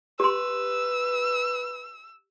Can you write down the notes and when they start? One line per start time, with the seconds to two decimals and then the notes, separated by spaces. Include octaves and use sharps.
0.20 G4 B4 C6 E6